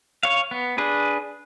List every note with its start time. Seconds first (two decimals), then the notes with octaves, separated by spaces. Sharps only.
0.23 C#5 F5
0.51 B3
0.78 D4 G#4 B4